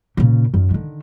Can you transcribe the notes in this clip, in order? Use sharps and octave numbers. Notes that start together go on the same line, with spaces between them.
A#2 C#3
F#2 D#3
D3 D#3